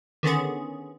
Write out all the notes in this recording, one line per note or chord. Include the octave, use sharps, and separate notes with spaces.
D3 D#3 B3 C#4 G#4